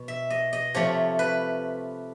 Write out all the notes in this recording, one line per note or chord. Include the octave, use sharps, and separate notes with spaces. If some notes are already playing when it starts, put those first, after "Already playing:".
Already playing: B2
E5
D#5
D#5
C3 F3 A3 C#5
B4